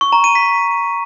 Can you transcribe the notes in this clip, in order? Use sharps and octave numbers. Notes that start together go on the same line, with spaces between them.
C#6
A#5
D#7
B6